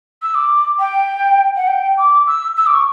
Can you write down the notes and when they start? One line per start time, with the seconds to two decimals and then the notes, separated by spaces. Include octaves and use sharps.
0.22 E6
0.35 D6
0.79 G5
1.56 F#5
1.67 G5
1.98 D6
2.27 E6
2.57 E6
2.66 D6
2.74 C#6